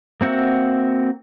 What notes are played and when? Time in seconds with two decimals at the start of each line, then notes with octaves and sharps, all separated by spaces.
0.21 A#3 C4 F#4 E5 F#5